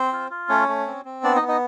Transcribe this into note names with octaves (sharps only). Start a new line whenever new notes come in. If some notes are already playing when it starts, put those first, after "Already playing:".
Already playing: C4 C5
F4
F4
A3 C#4 C#5
A3
C4
C4
B3 D4 D5
D#4 D#5
B3
D#4 D#5